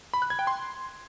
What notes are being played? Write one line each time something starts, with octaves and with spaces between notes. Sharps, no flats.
B5
F#6
G#6
G5
C6